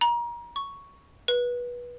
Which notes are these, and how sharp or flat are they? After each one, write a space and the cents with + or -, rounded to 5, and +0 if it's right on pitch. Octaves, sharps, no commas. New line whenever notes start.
A#5 +30
C#6 +5
B4 -20